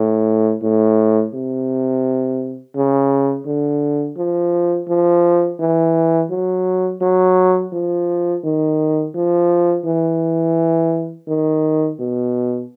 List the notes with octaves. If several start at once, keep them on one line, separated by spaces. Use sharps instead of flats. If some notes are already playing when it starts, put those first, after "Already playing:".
Already playing: A2
A2
C3
C#3
D3
F3
F3
E3
F#3
F#3
F3
D#3
F3
E3
D#3
B2